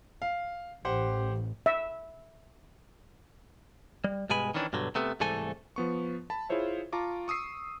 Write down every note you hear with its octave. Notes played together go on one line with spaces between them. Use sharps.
F5
A1 G4 C5 F#5
E5
G3
G2 B2 G#3 G#5 B5
D#3 E3 C#4 D4
G2 B2 D3 F#3
C3 A3 B3
C2 G#2 E3 A3 A4 G#5
F3 B3 C#6
A5 B5
E4 F4 G#4 C5 C#5 E5
F4 A5 A#5 C#6 D6
C#6 D#6 E6 C7 D#7